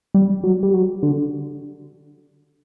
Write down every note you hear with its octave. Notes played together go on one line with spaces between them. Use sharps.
G3
F#3
G3
F#3
D3